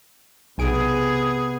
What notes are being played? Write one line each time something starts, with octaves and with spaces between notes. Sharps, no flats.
B1 C3 B3 G#4 G#5 D7